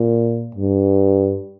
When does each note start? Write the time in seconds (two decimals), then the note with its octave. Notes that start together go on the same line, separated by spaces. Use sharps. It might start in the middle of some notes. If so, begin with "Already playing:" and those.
Already playing: A#2
0.55 G2